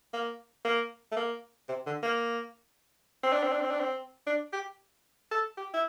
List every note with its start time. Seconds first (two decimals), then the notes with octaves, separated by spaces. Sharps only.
0.13 A#3
0.65 A#3
1.11 A3
1.16 A#3
1.69 C3
1.86 D3
2.03 A#3
3.23 C4
3.33 D4
3.43 C4
3.53 D4
3.61 C4
3.71 D4
3.80 C4
4.27 D4
4.53 G4
5.31 A4
5.57 G4
5.74 E4